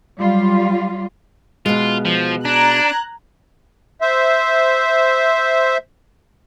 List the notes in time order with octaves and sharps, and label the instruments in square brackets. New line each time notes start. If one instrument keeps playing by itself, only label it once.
[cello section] F#3 G3 F4
[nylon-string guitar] B2 G#3 [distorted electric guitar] F4
[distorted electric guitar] F3
[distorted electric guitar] D4 [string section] A#5 F#6 G#6
[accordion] C5 E5